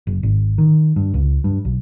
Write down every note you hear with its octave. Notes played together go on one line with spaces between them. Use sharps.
F#1
G#1
D#3
G2
C#2
G2
B1